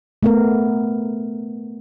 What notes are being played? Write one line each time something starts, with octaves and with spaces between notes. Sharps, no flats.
A3 B3 A#4